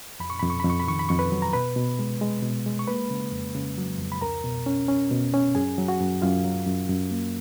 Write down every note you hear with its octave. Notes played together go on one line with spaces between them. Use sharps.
F2 B5
C#6
F2 B5
C#6
F2 B5
C#6
B5
D#3 C#6
B5
F2 C#6
B4 B5
F#3
A#5
B2 B4 B5
B2
G#3
G#3
B2
G#3
C#6
A#3 B4 B5
C#3
F2
C#3
F#3
F2
B5
C#2 A#4 A#5
B2
C#4
C#4
B2
C#4
F#2 G#4 G#5
F#3
F#4 F#5
F#2
F#2 F4 F5
F#3
F#2
F#2
A#3